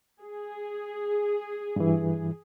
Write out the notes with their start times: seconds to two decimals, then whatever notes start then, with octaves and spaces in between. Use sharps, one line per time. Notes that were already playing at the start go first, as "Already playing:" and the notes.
0.21 G#4
1.76 G2 E3